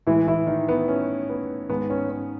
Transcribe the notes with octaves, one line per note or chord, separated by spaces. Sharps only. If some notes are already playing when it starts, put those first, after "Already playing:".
A2 E3 G#3 E4
E3 E4
D#3 D#4
B3
C#4
B3
G#2 D#3 G#3 B3
C#4
C#4